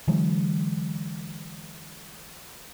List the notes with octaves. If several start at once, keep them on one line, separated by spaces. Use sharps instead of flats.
D3 E3 F#3 G#3